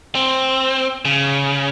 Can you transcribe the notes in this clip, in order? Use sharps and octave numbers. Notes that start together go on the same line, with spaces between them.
C4
C#3